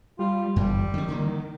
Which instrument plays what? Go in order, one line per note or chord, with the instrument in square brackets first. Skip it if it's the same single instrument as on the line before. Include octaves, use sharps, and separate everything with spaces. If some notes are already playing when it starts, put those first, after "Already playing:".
[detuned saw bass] G3 [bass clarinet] F4
[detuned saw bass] G1 [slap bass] F#2 E3 [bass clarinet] G3
[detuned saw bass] D#3 [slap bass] F3 C#4
[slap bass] D3 E3 A#3